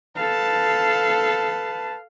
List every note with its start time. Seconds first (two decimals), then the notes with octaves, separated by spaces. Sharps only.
0.17 A4 B4 F5 A5